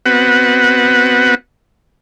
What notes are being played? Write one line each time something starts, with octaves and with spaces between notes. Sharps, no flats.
B3 C4 F#4 B4 F#5